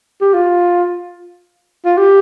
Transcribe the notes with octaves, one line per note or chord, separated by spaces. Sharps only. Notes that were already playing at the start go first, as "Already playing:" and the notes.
G4
F4
F4
G4